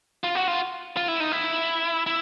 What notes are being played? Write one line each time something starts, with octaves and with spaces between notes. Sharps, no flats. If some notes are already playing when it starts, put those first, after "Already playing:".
F4
F#4
F4
F4
E4
D#4
E4
E4